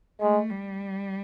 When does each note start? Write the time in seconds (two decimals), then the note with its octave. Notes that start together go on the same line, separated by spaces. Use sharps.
0.21 G#3 A3
0.50 G3